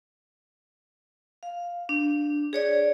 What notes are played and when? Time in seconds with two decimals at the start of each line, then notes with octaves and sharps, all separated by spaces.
1.43 F5
1.89 D4
2.53 G#4 C#5 D5